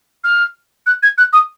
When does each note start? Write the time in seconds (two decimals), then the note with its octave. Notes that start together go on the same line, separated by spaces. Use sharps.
0.24 F6
0.86 F#6
1.03 G#6
1.18 F#6
1.33 D#6